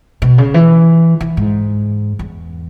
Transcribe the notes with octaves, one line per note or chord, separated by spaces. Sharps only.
B2
C#3
E3
E3
G#2
E2